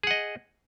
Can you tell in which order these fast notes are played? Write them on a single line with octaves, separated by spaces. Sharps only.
G#4 F#5 D#5